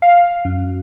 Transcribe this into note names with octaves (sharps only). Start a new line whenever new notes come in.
F5
F#2